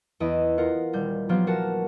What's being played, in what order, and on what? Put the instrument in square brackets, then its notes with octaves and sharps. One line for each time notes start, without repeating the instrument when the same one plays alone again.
[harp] E2 E4 D#5 B5 E6 D7
F4 A#4 F#5
D#1 G3 G6
F3 F#3 A#3 B3 F4 G4
F#4 A#4 F#5 A5